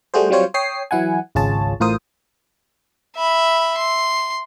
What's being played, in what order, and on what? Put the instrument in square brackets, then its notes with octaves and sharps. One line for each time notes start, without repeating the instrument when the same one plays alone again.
[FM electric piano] G3 A3 F#4 G#4 C5
F#3 G3 C4 F4 C5 C#5
C#5 G5 D#6 C7
E3 F#3 E4 F#5 G#5
G#1 C#2 F4 G#4 C#5 A5
A1 A2 F4 A#4 C5 D#6
[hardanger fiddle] E5 B5
C6